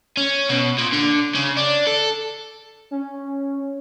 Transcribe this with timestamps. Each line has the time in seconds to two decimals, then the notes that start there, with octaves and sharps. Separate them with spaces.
0.17 C#4
0.49 B2
0.78 A#2
0.93 D3
1.35 C#3
1.57 D4
1.87 A4
2.91 C#4